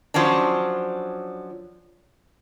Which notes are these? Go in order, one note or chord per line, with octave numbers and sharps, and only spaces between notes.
F3 F#3 C#4 D4